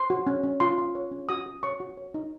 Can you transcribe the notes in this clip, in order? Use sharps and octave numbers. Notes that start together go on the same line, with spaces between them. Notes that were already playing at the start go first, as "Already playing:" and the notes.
Already playing: C5 C6
F#4
C#4
C#4
F4 C6
F4
C#5
C#4
F#4 D#6
F#4
C#5 C#6
F#4
C#5
D#4